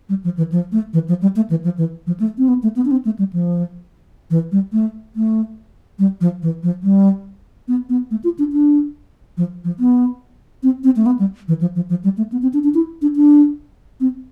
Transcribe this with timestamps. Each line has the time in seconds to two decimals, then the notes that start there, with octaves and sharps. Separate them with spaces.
0.09 G3
0.24 F3
0.37 E3
0.52 F3
0.72 A3
0.93 E3
1.08 F3
1.22 G3
1.36 A3
1.50 E3
1.64 F3
1.78 E3
2.07 F3
2.20 A3
2.38 C4
2.48 B3
2.63 A3
2.76 B3
2.85 D4
2.91 C4
3.05 A3
3.19 G3
3.33 F3
4.30 E3
4.52 G3
4.73 A3
5.16 A3
5.99 G3
6.21 F3
6.42 E3
6.63 F3
6.83 G3
7.68 B3
7.89 B3
8.11 A3
8.24 F4
8.39 D4
8.52 D4
9.37 F3
9.64 F3
9.80 B3
10.63 C4
10.84 C4
10.96 A3
11.06 B3
11.19 G3
11.48 E3
11.61 F3
11.76 F3
11.90 F3
12.04 G3
12.18 A3
12.32 B3
12.42 C4
12.54 D4
12.64 D4
12.74 E4
13.02 D4
13.16 D4
14.00 C4